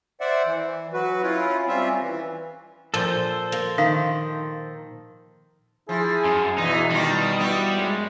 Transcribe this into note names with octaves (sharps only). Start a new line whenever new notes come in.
C5 D5 E5 F#5
E3
F#3 F#4 B4
C#4 E4 F4
G3 C4 C#4 F4 E5
E3
A#2 F3 A4 C5
A#3
D#3 F5
F3 E4 G#4
F#2
E2 B2 E3 D#4 D#5
D#3 G3 F4
B3 E4 F#4
F#2 G#3